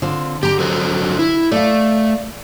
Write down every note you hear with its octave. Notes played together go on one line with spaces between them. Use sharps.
D3 C4 F4
D3 G4 A#5
F#3 A4 C5
E4
A3 D5 F5